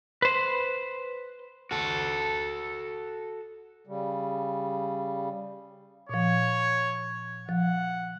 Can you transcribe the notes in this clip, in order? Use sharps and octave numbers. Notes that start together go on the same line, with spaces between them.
B4 C5
F#4 A4
C#3 G3
A#2 F3 C#5
F3 F#5